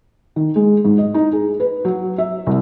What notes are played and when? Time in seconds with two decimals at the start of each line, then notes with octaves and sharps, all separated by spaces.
0.36 D#3
0.56 G#3
0.85 G#2
0.98 D#5
1.14 D#4
1.33 G#4
1.60 B4
1.85 F#3
2.18 E5
2.47 C2